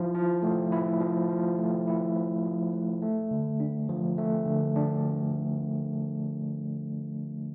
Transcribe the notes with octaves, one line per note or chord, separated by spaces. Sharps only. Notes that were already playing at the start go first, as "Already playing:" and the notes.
Already playing: F3 E4
F3
A3
E4
F3
F3
A3
E4
F3
F3
A3
A3
D3
D4
F3
A3
D3
D4